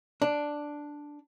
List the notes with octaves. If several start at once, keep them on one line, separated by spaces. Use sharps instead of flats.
D4